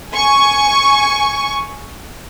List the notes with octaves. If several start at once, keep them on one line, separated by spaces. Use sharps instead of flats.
G#5 C#6